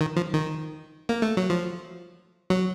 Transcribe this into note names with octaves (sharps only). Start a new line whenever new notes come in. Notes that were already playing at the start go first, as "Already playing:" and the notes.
D#3
F3
D#3
A#3
A3
F#3
F3
F#3